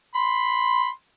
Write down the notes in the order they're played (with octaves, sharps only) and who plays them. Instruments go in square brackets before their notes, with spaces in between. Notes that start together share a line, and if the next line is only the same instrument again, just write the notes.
[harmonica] B5 C6